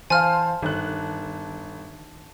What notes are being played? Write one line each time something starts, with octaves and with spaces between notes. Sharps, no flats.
E3 C5 F5 G#5 A5 F6
G1 D#3 F#6